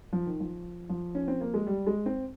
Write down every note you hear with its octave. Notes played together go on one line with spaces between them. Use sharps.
F3
D#3
F3
F3
C#4
C4
A#3
G#3
G3
G#3
C4